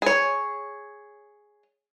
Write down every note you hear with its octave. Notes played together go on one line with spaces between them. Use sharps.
G#4 C#5